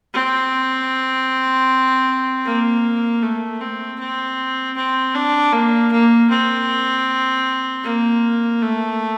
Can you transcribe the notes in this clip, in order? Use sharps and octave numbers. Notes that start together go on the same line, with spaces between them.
C4
A#3
A3
C4
C4
C4
D4
A#3
A#3
C4
A#3
A3